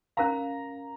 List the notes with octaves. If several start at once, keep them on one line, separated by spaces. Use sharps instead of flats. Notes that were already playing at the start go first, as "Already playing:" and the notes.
C#4 A#4 F5 A#5